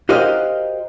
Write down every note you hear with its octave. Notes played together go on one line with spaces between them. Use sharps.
F#4 G4 A#4 C5 D#5 F5